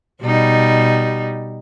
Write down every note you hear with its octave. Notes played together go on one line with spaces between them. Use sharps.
B2 G3 D#4